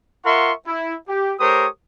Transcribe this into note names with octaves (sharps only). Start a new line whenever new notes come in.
F4 A#4 E5 F#5 C6 C#6
E4
G4
A3 G4 A#4 C5 C#5 D#6